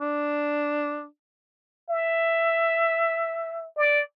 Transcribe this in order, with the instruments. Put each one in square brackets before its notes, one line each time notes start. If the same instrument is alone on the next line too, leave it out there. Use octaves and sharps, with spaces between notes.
[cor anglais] D4
[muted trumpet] E5
D5